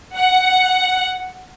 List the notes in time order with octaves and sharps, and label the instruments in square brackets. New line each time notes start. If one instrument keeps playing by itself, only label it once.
[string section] F#5